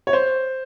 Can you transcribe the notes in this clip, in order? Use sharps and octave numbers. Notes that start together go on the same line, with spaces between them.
C#5
C5